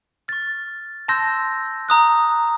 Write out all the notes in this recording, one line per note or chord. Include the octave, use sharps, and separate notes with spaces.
C#6 F6 A6
A5 C6 E6 G6 A#6
A#5 D#6 F#6